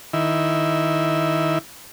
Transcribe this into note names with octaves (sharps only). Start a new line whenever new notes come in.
D#3 E4